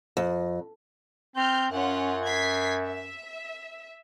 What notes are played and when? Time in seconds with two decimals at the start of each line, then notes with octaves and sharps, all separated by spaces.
0.17 F2
1.36 C4 F6 G6
1.71 F#2 C#4 F4 F#5
2.25 G#6 B6 C7
2.85 E5